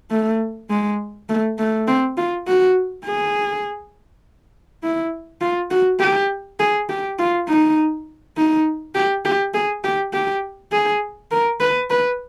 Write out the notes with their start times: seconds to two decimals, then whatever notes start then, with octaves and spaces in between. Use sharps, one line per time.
0.11 A3
0.70 G#3
1.29 A3
1.58 A3
1.88 C4
2.18 F4
2.47 F#4
3.05 G#4
4.83 E4
5.41 F4
5.71 F#4
6.00 G4
6.60 G#4
6.89 G4
7.19 F4
7.48 D#4
8.37 D#4
8.95 G4
9.25 G4
9.54 G#4
9.84 G4
10.13 G4
10.72 G#4
11.32 A#4
11.60 B4
11.90 B4